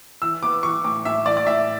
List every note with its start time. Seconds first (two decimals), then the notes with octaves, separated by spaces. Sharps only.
0.22 E3 E6
0.43 B3 D6
0.63 E3 C#6
0.84 A2 D6
1.05 A2 E5
1.26 E3 D5
1.37 D5
1.47 A2 E5